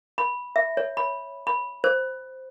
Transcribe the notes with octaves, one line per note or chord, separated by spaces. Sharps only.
B5
E5
C#5
B5
B5
C5